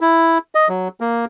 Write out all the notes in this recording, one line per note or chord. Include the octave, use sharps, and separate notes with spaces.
E4
D#5
F#3
A#3